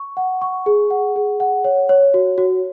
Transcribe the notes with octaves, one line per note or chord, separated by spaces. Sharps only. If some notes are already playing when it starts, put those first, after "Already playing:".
Already playing: C#6
F#5
C#6
G#4
F#5
G#4
F#5
C#5
C#5
F#4
F#4